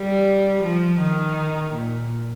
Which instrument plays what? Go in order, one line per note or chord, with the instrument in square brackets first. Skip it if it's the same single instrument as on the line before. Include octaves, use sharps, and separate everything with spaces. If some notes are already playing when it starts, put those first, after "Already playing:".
Already playing: [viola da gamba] G3
F3
D#3
A#2